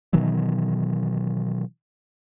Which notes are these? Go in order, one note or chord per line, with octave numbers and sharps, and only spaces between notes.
B2 D#3 E3 F#3